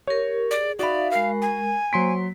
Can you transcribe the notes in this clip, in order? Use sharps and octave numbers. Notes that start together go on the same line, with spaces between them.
G4 A#4 C#5
G#4 D5
D#4 F#4 D5 E5 F5 B5
G#3 A#4 F5
G#5
F#3 A#3 C5 C6 B6